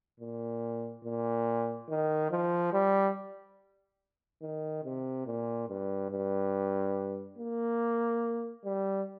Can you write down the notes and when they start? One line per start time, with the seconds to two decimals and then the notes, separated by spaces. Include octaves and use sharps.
0.20 A#2
1.04 A#2
1.89 D#3
2.31 F3
2.73 G3
4.42 D#3
4.84 C3
5.26 A#2
5.69 G2
6.11 G2
7.38 A#3
8.64 G3